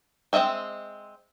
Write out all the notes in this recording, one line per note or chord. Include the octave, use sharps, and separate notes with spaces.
G#3 C4 D#5 E5 G5